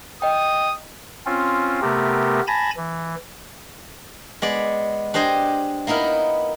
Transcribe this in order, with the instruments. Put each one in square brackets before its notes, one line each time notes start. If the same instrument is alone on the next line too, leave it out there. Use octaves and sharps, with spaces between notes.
[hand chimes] D#5 G5 [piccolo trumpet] D#6
[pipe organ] C4 C#4 F4
C3 A3 B3 G4 A#4
G#5 A5 B5 G#6 A#6
E3
[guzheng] G#3 B3 D5
D4 G4 C5 D#5 G#5
A#3 B3 D#4 E4 A#4